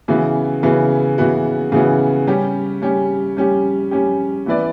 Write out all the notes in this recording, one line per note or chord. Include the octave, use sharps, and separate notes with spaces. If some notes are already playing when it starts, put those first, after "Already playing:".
C#3 E3 B3 F#4
C#3 E3 B3 F#4
C#3 E3 B3 F#4
C#3 E3 B3 F#4
G3 C#4 G4
G3 C#4 G4
G3 C#4 G4
G3 C#4 G4
E3 B3 E4 B4 D5